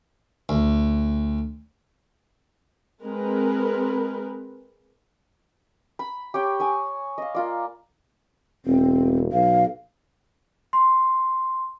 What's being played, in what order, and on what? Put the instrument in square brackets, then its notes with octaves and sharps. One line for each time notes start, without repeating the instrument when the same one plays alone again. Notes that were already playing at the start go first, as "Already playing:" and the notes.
[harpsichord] D2
[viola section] G#3 C4 A#4 B4
[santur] B5
G4 C#5 G5
G#5 C#6 D#6
D#5 F5
A#3 F4 D5
[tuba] E1 [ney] C4
[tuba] B1 [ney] F5
[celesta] C6